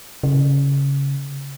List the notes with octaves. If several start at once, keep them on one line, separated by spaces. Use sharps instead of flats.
C#3